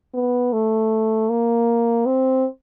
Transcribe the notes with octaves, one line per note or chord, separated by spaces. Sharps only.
B3
A3
A#3
C4